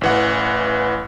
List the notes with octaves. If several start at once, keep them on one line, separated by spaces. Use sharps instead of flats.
A1 E3 F#5